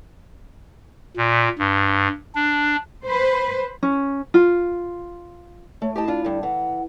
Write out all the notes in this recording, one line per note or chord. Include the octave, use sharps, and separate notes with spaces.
A#2
G2
D4
B4 C5
C#4
F4
A3 C#5
E4 G4 D#5 A5
D4 F4
G2 D3
E3 F#5